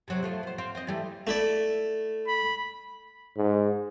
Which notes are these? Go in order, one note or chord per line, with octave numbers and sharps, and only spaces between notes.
C3 F#3 C4
F3 A3 F4
B3 C5
C4 F5
C4 C5 D#5
E3 G3 A3
A3 E4 D5
B5
G#2